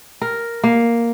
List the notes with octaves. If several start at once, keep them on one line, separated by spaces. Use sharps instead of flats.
A#4
A#3